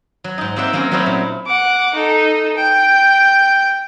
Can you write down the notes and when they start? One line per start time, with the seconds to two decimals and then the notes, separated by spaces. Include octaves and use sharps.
0.24 F#3
0.38 G#2 D#4
0.56 A#3 C4 G4 D5 E5 F#5
0.73 F#3 A#3 C4 C#4
0.91 F#3 A3 C4 D#4 E4 C#5
1.06 A#2
1.46 F#5 D6
1.94 D#4 A4
2.57 G5